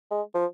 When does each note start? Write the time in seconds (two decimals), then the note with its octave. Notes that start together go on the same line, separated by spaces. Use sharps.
0.11 G#3
0.35 F3